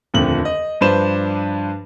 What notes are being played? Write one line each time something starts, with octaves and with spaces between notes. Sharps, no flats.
D#1 F2 D3 A3 F#7
D#5
G2 F3 D4 B4 C5 E7